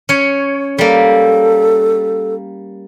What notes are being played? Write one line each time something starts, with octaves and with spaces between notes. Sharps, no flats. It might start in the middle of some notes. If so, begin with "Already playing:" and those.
C#4 C#5
G3 A#3 A4